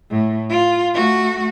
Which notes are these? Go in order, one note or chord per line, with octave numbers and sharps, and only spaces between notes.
A2
F4
A3 F#4